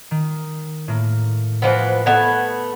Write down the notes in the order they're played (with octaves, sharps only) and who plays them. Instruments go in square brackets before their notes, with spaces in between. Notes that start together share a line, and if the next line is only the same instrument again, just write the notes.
[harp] D#3
A2 A#3
[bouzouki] E3 F3 B3
[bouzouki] A3 B3 A5 [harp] G#6